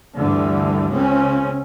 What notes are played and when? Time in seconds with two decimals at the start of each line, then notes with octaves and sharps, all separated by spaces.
0.17 D2 G2 D3 E3
0.93 C#2 C#3 C4 C#4